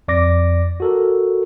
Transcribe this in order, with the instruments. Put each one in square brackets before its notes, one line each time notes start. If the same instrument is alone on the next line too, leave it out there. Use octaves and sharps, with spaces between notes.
[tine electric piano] F2 D5 D6 A#6
F#4 A4 A#4